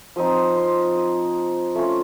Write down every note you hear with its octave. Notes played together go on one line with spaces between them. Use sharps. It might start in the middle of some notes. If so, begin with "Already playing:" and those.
F3 C4 D#4 D#6
D#6
C6
D#6
A3 C#4 F4